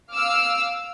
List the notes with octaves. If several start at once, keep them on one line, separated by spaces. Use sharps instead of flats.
F5 D6 E6 F6